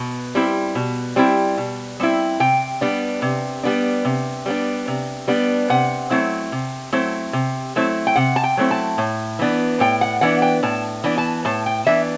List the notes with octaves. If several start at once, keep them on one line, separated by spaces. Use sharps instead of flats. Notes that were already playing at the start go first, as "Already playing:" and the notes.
Already playing: B2
G3 C4 E4
B2
G3 C4 E4
B2
G3 C4 E4
C3 G5
G3 B3 D4
C3
G3 B3 D4
C3
G3 B3 D4
C3
G3 B3 D4
C3 F#5
F#3 A3 C4 E4
C3
F#3 A3 C4 E4
C3
F#3 A3 C4 E4
G5
C3 F#5
A5
G5
F#3 A3 C4 E4
A5
A2
E3 B3 D4
A2 G5
F#5
E3 B3 D4 F#5
G5
A2 A5
E3 B3 D4
A5
A2 A5
G5
E3 B3 D4 E5